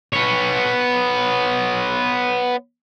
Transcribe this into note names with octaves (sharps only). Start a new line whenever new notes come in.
B3 C#5